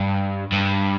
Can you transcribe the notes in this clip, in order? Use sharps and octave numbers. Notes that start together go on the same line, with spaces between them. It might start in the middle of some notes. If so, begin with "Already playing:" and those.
Already playing: G2
G2